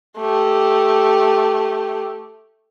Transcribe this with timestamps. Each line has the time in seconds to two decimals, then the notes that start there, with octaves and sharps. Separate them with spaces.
0.17 A3 G4